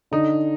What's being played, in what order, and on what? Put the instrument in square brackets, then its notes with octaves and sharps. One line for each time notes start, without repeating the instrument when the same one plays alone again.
[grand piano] D3 [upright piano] D#4